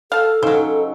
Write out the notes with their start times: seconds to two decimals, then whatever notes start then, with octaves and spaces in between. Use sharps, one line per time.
0.12 A4 F5 A5
0.43 C#3 F#3 D#4 C5